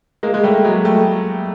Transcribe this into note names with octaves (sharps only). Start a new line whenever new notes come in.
G#3 A#3
G#3
G3 A3
F#3 G#3
G3 A3